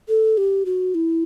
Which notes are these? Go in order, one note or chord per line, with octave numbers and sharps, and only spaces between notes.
A4
G4
F#4
E4